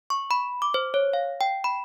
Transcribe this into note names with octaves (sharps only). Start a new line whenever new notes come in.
C#6
B5
D6
C5
C#5
F5
G5
B5